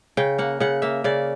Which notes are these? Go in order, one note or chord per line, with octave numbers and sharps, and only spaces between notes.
C#3 G5
A#3 F#5
C#3 F#5
A#3 E5
C#3 D5